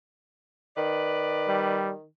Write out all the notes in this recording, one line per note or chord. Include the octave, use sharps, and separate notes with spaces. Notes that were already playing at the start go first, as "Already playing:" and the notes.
D#3 B4 D5
G3